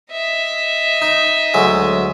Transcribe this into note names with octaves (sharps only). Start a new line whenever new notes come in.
D#5 E5
D#4
D2 F#3 G#3